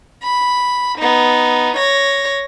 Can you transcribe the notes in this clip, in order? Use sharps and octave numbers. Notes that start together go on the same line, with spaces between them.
B5
B3 D#4
C#5 A#6